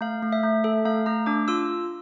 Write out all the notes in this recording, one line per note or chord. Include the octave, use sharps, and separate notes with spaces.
A3 F5
A3
E5
A3
A4 E5
A3 F5
A3 A#5
D4 D6
F4 E6